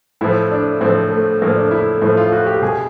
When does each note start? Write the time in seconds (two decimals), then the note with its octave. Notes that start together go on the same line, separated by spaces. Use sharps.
0.21 A2 F3 E4
0.51 D4
0.81 A2 F3 C4
1.12 A3
1.42 A2 F3 A#3
1.56 D4
1.71 E4
2.02 A2 F3 E4
2.17 F4
2.32 F#4
2.47 G4
2.62 B2 G#4